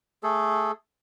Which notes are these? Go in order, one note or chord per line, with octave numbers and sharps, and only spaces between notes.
A3 G#4 A4